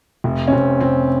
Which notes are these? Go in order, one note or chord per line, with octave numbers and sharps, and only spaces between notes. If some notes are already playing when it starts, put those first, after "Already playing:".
F1
C#4
F1 C4
F1 C4